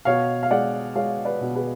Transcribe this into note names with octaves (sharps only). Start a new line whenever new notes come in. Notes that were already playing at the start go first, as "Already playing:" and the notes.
B2 C#5 F5
F5
G#3 D5 F#5
G#3 C#5 F5
B4 D5
B2
G#4 B4